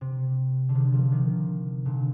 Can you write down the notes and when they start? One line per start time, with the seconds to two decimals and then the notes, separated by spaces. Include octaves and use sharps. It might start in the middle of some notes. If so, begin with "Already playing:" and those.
0.01 C3
0.69 D3
0.75 C3 D#3
0.93 D3 F3
1.11 C3 D#3
1.85 A#2 D3